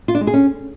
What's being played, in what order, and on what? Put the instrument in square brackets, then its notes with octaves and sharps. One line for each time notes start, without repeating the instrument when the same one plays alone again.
[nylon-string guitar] F4
D4
G#3
G#4
C#4